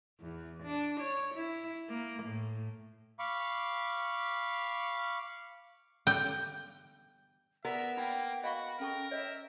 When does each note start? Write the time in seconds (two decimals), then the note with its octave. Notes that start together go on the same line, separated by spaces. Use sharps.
0.20 E2
0.63 D4
1.01 C#5
1.35 E4
1.89 A#3
2.24 A2
3.19 F5 B5 C#6 D6
6.07 G5
7.65 B3 A#4 D5 E5
7.97 A#3 D#4 G5 B5
8.44 F#4 D#5 F5 B5 C#6
8.80 C#4 A4 A#4 G5 C#6
9.11 C#5 D#5 E5